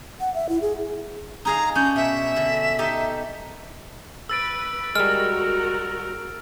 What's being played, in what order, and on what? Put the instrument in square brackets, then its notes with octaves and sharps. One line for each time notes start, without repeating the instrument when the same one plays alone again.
[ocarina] F#5
E5
E4
G#4
[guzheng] D#4 G#4 F5 [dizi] A#5
[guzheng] C#4 D4 [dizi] G6
[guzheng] B2 [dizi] E5
[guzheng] D3
D#4 G4 A4
[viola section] B4 [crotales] E6 A6 D7
[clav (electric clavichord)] G3 G#3 [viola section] F#4 A#4 [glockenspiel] F6